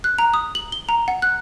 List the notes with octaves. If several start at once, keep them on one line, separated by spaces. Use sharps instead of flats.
F#6
A#5
D#6
F#7
G7
A#5
F#5
F#6